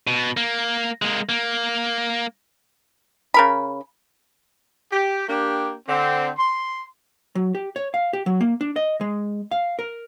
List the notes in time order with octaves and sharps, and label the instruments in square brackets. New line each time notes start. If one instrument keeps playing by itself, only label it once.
[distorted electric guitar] B2
A#3
G#3 A#3
A#3
[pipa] C#3 A#4 B5
[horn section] G4
A#3 D4 G4
D3 C4
C6
[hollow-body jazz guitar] F#3
G4
C#5
F5
G4
F#3
A#3
D4
D#5
G#3
F5
A#4